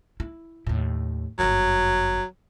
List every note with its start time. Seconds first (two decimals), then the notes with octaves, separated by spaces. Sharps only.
0.20 E4
0.67 D#2 A2
1.39 G1 F#2 F#3